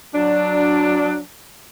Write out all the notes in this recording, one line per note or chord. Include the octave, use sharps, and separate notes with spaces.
F#3 D4